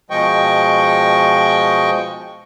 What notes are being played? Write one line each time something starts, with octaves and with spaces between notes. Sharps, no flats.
B2 F3 G#3 D#5 G5 C#6